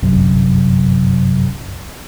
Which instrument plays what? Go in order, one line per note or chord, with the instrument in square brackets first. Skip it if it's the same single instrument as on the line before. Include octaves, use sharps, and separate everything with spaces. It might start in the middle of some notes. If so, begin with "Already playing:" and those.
[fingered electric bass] G1 C2 F#2 C3